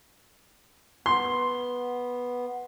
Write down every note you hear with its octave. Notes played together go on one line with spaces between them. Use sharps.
B3 C6